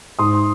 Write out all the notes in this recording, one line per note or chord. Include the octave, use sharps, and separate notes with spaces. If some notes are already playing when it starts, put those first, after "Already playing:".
G#2 C6 D#6